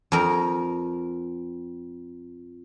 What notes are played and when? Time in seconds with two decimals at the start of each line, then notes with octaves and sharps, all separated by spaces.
0.12 F2 A#4